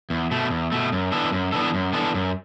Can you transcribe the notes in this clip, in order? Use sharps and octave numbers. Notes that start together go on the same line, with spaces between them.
E2
B2 A3
E2
B2 A3
F#2
E3 B3 D4 A4
F#2
E3 B3 D4 A4
F#2
E3 B3 D4 A4
F#2